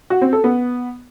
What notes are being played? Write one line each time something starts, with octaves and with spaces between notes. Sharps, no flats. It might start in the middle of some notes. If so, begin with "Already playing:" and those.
F#4
C4
A4
B3